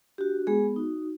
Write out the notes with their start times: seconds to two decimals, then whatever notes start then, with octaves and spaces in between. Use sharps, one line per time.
0.18 D4 F#4 G4
0.47 G#3 B3 G#4
0.76 D#4 F#4